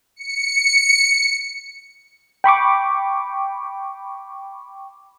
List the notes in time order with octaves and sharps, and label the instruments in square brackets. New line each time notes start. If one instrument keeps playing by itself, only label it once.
[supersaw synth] C#7
[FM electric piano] G5 B5 C#6 D6